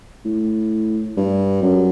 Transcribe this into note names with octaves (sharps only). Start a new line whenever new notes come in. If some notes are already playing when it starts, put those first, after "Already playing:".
A2
G2
F#2